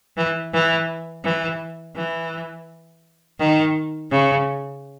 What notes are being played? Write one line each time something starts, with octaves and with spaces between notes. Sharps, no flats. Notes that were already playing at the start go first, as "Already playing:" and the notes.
E3
E3
E3
E3
D#3
C#3